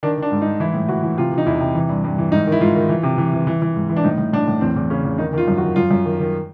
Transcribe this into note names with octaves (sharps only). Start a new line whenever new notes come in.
D#3 D4
D#3 D4
G#2
D#4
G#2
E3 E4
A2
E3 F#4
E3
C3 F4
E3
D#4
E2 E4
C3
E3
G2
G2
E3
G#2 D#4
D#3 E4
G#2 F4
D#3
E3
C3
E3
E3
E3
E3
G#2
E3
D4
A2 D#4
A2
A2 D4
A2
E2 C4
E2
C#3 C#4
E2
D#3 D#4
D#3 F4
F#2
F#4
D#3
F#2 F4
F#2
D#3
D#3